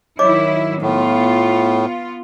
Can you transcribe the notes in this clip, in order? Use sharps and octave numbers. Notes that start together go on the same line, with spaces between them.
D#3 F#3 E4 C#5 D#5 D6
A2 B3 F4